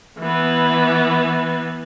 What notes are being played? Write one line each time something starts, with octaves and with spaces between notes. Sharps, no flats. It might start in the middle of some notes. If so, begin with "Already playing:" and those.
E3 B3